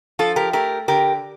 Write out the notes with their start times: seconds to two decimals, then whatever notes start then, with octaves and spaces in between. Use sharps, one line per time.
0.19 F3 F4 A4
0.36 G4 A#4
0.53 A3 G4 A#4
0.88 D3 G4 A#4